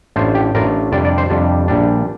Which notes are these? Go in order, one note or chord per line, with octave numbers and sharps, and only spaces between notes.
A1 A2 A3 D4 F4 C5
G4
A1 A2 A3 D4 F4 A#4
F2 C3 G3 D4 D5
D5
C5
F2 C3 G3 D4
A#1 A#2 G3 D4